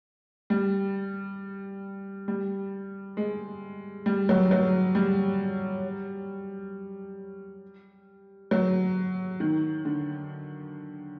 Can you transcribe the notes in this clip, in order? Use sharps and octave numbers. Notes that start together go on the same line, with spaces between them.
G3
G3
G#3
G3
F#3
F#3
G3
F#3
D#3
D3